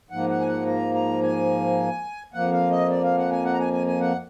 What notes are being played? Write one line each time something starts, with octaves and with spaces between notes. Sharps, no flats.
G#2 F3 A#3 F#5
F#5
G#5
F#5
A#5
A#5
G#5
F2 F3 A#3 F#5
F5
D#5
D5
F5
F#5
G#5
F#5
A#5
G#5
G#5
G#5
F#5